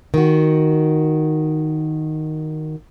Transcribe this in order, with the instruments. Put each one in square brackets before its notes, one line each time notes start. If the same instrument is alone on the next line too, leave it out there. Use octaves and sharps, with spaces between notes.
[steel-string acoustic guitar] D#3 F#4